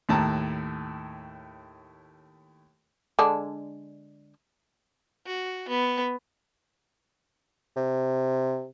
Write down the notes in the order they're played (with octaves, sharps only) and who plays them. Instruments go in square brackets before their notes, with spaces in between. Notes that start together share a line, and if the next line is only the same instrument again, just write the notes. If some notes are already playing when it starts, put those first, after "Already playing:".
[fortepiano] D#2 A2 A5 A#5
[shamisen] D3 G#3 D4
[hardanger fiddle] F#4
B3
[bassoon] C3